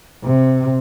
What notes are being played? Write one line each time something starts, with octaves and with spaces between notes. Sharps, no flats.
C3